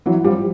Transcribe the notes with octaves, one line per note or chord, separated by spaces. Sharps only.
E3 F#3
F3 G3